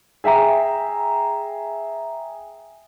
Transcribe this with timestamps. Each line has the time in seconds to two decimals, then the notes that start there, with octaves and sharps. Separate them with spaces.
0.24 G#4 E5 G5 A#5